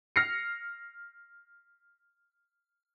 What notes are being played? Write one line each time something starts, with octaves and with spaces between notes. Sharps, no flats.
F6 A#6 C7 C#7